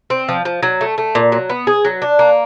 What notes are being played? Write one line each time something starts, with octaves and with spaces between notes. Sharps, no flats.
C4
F3
F3
F#3
A3
A3
A#2
F#3
B3
G#4
F#3
D4
A#3